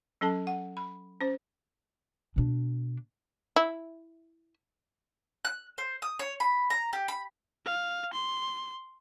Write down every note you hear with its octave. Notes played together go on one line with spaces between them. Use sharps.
F#3 C#4 A4 A5
F#5
B5
C#4 C5
B2 D4
E4
F#6
C5
D#6
C#5
B5
A#5
G4
B5
F5
C6